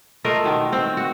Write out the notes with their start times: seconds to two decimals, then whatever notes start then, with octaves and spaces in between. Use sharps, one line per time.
0.24 A3 F4 A#4 D#5
0.44 B2 D#3
0.73 C4
0.97 F#4